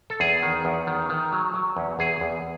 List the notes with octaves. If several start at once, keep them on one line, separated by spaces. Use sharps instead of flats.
A4
E2 G#4
D#3
E2
D#3
D#3
F#3
F#3
E2
E2 G#4
E2